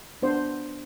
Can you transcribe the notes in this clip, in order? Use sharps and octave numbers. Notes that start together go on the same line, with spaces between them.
B3 D4 C5